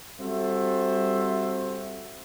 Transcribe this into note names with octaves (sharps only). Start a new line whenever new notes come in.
G3 C4 F#4 A4 C5 E5